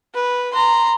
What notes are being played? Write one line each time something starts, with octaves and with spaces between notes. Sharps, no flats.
B4
A#5 C6